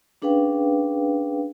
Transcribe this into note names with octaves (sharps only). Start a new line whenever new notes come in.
C#4 D4 G#4 B4 F5 G5